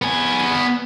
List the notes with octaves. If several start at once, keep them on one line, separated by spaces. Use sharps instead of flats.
B3 G#5